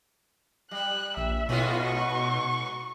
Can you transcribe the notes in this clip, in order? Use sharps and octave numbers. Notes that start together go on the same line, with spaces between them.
G3 F#6
A#1 E5
G#2 B2 B3 F4 F#4
C#6